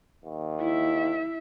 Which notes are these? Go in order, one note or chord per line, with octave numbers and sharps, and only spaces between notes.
D#2
E4 E5